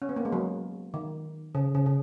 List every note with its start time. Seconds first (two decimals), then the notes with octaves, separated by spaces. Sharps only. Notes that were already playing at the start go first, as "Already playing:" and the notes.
0.02 C#4
0.09 B3
0.16 A#3
0.25 G#3
0.32 F#3
0.94 D#3
1.55 C#3
1.75 C#3
1.86 C#3